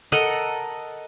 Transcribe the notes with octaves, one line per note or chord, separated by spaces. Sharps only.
A4 A#4 D#5 F#5